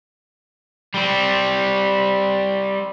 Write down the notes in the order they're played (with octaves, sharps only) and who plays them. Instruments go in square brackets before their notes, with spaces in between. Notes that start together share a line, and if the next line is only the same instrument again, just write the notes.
[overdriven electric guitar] G3 C4